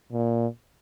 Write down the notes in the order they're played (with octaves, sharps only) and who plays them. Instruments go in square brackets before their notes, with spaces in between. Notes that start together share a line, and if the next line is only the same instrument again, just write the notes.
[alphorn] A#2